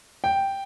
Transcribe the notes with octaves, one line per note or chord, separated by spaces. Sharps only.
G5